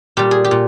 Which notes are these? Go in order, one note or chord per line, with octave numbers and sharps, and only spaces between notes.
A#2 G3 G4
G#4
G4
A#2